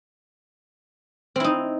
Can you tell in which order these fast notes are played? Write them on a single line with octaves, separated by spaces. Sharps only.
C4 E4 D#4